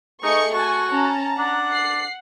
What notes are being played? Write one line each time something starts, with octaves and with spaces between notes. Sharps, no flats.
A3 D#4 G#4 D#5 C#6 C#7
F#4 G#5 A5 C#6
C#4 A5 A#5
D4 F#5
C7